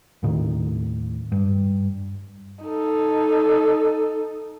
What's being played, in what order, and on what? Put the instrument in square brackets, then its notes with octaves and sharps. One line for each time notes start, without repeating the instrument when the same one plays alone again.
[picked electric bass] D#2 A2 D#3
G2
[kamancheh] D#4 A4